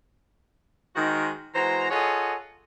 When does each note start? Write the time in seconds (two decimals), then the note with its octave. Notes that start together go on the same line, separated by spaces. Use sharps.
0.95 D#3 G#3 D#4 F#4 A#4 C5
1.54 E3 G#3 F#4 C5 A#5
1.91 F4 G#4 A4 C#5 D#5 F#5